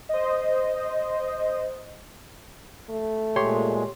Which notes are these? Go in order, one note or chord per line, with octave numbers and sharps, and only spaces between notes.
C5 D#5
A3
A#2 G#3 G4 C#5 C6